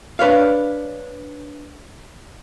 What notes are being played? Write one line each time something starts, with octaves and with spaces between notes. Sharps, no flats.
D4 B4 C#5 F5